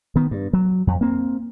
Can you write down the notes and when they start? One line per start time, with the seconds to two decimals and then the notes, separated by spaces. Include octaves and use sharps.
0.16 D#3 B3
0.31 G2
0.53 F#3
0.87 F2
1.01 A#3 C4